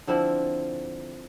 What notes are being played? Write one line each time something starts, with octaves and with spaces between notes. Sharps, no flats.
D3 F3 C4 E4